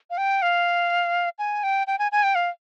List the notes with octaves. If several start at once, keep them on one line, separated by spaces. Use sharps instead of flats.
F5
G5
F5
G#5
G5
G5
G#5
G#5
G5
F5